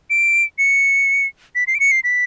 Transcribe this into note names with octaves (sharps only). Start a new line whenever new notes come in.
D7
C#7
B6
C7
D7
C#7
C7
B6